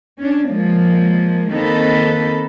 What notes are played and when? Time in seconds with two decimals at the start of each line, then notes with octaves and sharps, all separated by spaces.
0.19 C#4 D4
0.49 F3 G#3 A#3
1.51 D#3 A#3 C4 D#4 A4 B4